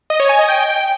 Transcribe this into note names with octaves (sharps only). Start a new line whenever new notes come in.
D#5
C#5
G#5
D#5
G5